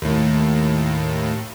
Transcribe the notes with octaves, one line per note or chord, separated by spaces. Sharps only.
D#2 A2